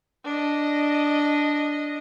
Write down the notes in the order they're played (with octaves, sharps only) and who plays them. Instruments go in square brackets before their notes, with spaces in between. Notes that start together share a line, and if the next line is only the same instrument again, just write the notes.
[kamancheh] D4 D#5